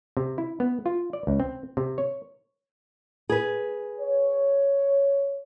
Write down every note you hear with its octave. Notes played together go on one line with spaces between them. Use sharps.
C3
E4
B3
F4
D5
C#2
C4
C3
C#5
G#4 B4
C#5